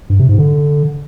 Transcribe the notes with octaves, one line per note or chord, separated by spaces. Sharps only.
G2
C3
G#2
D3